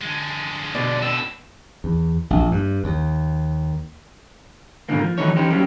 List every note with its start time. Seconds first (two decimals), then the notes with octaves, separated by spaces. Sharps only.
0.01 D3 G#3
0.75 B2 D5
1.02 A2 D3 E6
1.84 E2
2.30 A#1
2.51 G2
2.84 D#2
4.89 G#2 B2 D3 D#3 A#3
5.01 F3
5.18 D#3 E3 F#3 A3 D#4 C#5
5.35 E3 C#4 D#4 G4 C5
5.50 F#3 G3 A#3 C#4 G4